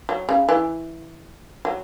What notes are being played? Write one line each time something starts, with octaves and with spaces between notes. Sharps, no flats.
F#3
C#3
E3
F#3